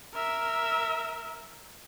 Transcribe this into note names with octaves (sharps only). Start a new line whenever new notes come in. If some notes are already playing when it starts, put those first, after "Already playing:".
A#4 E5